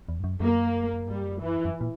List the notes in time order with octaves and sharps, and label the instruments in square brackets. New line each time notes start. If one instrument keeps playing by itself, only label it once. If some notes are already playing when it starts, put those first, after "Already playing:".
[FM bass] E2
G2
F#2
[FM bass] F#2 [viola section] A#3
[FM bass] G2 [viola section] G3
[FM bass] F#2
[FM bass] G2 [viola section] E3
[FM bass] F#2
F#2
A#2